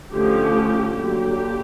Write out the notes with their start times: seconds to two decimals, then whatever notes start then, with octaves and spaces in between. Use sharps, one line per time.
0.12 D3 F3 A3 C#4 G4
0.93 D3 F#3 A#3 G4